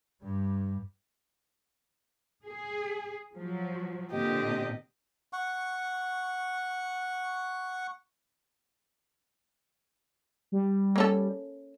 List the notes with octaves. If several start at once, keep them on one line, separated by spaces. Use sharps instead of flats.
G2 G3
G#4
F3 F#3
A#2 D3 C4 G4 D#5
F#5 C#6
G3
A#3 C#4 A4